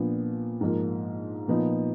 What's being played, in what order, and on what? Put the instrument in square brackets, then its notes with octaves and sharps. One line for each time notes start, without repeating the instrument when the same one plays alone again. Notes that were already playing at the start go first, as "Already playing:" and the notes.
Already playing: [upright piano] A#2 F3 B3 D4
G#2 F3 A#3
A#2 F3 B3 D#4